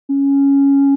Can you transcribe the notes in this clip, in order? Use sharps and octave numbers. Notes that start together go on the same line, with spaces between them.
C#4